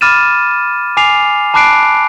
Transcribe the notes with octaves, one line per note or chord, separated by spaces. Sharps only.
B5 D6 F6 A6 D#7 E7
G#5 D6 C7 F7
A5 B5 D6 F#6 C7 D7